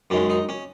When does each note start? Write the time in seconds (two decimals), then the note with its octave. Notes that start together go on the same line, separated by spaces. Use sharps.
0.10 F#2 D#3 G#3 C#4
0.30 D#4
0.49 C#4